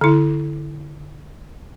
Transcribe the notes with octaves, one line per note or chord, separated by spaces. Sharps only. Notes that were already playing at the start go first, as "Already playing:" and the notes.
D3 E4